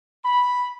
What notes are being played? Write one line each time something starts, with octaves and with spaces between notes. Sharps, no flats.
B5